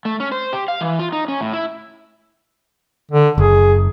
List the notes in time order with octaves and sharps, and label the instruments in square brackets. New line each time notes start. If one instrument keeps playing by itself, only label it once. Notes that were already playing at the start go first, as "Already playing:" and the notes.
[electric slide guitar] A3
C#4
C5
G4
F5
E3
F4
D#4
C#4
A2
E4
[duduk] D3
[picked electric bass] F#1 [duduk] G#4